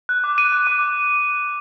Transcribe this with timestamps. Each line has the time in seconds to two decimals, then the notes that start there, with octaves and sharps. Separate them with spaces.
0.09 F#6
0.24 D6
0.38 F#6 D#7
0.52 F#6
0.67 D6